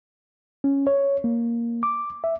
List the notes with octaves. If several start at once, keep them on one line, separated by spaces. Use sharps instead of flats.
C#4
C#5
A#3
D6
E5